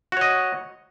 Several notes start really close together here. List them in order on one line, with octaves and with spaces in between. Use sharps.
F#4 C#5 D#5